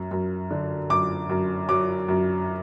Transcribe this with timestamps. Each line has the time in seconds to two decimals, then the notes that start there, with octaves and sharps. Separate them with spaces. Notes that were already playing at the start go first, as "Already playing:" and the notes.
Already playing: F#2 F#3
0.11 F#2
0.51 D3
0.90 F#2 D6
1.29 F#2
1.69 F#3 D6
2.08 F#2